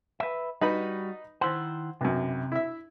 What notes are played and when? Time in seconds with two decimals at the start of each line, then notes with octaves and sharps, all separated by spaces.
0.20 B4 E5
0.61 G3 D#4 F#4 B4 B5
1.41 D#3 E4 C5 F#5
2.01 B1 F#2 C3
2.52 E4 E5